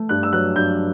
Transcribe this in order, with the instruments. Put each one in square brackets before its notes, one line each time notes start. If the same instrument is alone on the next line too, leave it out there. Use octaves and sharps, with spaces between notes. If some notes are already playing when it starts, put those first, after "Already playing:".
Already playing: [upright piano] A3
G2 F#6
E6
F#3 F#6
G2 G6